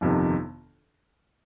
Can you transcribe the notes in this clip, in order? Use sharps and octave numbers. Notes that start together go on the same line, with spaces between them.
G1 F2 C3 D#3